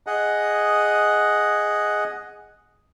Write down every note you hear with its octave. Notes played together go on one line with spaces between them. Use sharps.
G#4 D#5 F#5